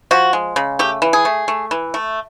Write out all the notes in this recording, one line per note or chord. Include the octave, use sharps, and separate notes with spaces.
F3 F#4
G#3
C#3
A3 G4
E3
G#4
A3
A3
E3
A3